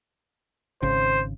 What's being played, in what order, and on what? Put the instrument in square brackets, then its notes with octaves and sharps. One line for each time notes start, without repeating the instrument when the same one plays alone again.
[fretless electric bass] G#1 C#3 [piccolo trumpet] C5